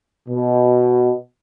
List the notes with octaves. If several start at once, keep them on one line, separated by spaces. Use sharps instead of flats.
B2